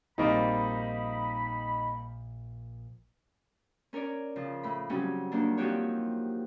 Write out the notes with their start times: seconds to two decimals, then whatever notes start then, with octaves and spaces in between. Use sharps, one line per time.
0.18 A#1 G3 A#3 C4 D#4 B5 A6 C7
3.93 C#4 A#4 C#5 D5
4.36 C#3 F3
4.63 A2 B5
4.90 C#3 F#3 G3 C4 C#4
5.32 D#3 A#3 D4
5.57 D#3 F3 C4 F#4 G4 C#5